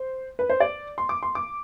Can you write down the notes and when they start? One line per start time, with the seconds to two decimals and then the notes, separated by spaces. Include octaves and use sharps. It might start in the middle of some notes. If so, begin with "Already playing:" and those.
Already playing: C5
0.39 B4
0.50 C5
0.60 D5
0.98 C6
1.09 D6
1.23 C6
1.35 D6